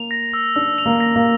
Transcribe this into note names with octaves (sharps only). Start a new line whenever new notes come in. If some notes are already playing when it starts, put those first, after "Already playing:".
Already playing: A#3 F7
A#6
E6
D4 E6
F7
A#3
A#6
A#3